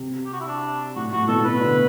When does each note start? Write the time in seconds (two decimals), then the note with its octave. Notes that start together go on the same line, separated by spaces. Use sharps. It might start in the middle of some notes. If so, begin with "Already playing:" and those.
Already playing: C3
0.26 G4
0.33 F#4
0.40 E4
0.47 D4
0.96 A2 F#4
1.12 A2 F#4
1.28 B2 A4
1.44 B2 B4
1.61 D3